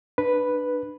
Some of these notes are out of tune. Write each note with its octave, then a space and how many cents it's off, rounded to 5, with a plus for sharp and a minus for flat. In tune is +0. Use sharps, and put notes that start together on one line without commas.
D4 +20 B4 +0